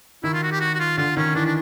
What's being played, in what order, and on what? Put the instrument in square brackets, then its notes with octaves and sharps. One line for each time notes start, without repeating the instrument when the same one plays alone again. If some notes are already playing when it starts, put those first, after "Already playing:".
[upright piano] D#3 [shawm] E4
[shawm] F4
F#4
G4
F#4
F#4
F4
[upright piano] D3 [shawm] F4
[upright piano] D#3 [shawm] C#4
[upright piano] E3 [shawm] D4
[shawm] D4